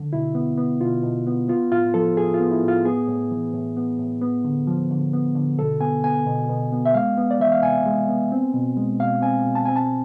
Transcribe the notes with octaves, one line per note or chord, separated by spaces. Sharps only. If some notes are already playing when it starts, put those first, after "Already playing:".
Already playing: D3
B2 E4
B3
B3
B2 F4
B2
B3
B3 F4
A2 F4
F3 A4
A2 G#4
F4
B3
E4
A2
F4
B3 G#4
A2
E3
A2
B3
A2
B3
D3
F3
D3
B3
D3
B2 A4
B3 G#5
B3 G#5
B2
B2
B3
E5
G#3 F5
B3
D5
E3 E5
F5
C3 G#5
G#3
B3
C4
B2
G#3
B2 F5
C4 G#5
B2
A5
C4 G#5
A5